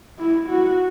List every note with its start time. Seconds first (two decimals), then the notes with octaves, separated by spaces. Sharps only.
0.19 E4
0.49 F#4